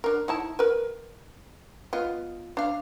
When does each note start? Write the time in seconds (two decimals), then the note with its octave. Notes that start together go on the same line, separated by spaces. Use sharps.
0.04 D4 A#4
0.28 D#4 E4 A5
0.59 A#4 B4
1.93 B3 F4 D#5
2.57 D4 F5